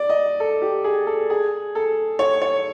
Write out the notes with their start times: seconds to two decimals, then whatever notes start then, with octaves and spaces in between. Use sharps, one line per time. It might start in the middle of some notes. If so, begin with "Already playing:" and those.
Already playing: D5
0.09 D#5
0.40 A4
0.62 G4
0.84 G#4
1.07 A4
1.30 G#4
1.75 A4
2.19 C#5
2.42 C#5